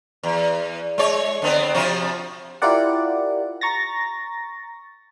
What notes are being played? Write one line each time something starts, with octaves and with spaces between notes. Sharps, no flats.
E2
G#3 C#5
D3 B3 C4
C3 F3 F#4
E4 F4 G4 A#4 D5 F#5
A#5 C#6 A6 A#6